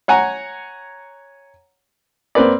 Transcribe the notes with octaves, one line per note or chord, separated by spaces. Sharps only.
C#5 F#5 G#5 A#5
A#3 C4 B4 D5